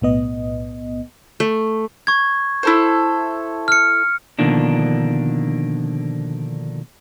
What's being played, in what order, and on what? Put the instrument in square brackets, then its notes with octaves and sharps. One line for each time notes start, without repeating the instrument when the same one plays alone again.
[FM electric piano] B1 A2 B3 D#5
[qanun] A3
[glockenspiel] C#6 G#6
[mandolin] E4 A4 C5
[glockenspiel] F6 C#7
[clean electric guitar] B2 D3 D#3 F3 A#3 D4